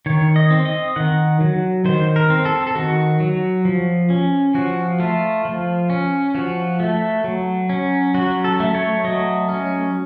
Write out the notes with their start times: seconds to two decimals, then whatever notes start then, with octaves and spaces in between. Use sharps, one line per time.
0.06 D#3 C#5
0.36 D#5
0.50 C4
0.65 D#5
0.96 D#3 F#5
1.41 F#3
1.85 D#3 C5
2.16 A#4
2.30 C4
2.45 A4
2.67 A4
2.75 D#3 F#4
3.20 F#3
3.65 F3
4.10 C#4
4.54 F3 F#4
5.00 A3 F4
5.45 F3
5.90 C#4
6.35 F3 F#4
6.80 A3
7.24 F#3
7.69 C#4
8.14 F#3 F#4
8.44 A4
8.60 A3
8.75 C#5
9.04 F#3 D#5
9.49 C#4